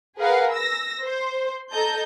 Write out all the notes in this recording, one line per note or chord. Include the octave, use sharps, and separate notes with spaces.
G#4 A#4 B4 F5 F#5
E6 A#6
C5
A4 D#5 A5 A#5 G6